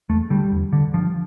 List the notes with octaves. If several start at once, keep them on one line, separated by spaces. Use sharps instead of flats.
E2 A3
D3 G3
E2
D3
G2 F3